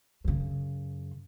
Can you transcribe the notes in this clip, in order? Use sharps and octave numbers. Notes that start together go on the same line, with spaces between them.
F#2 C#3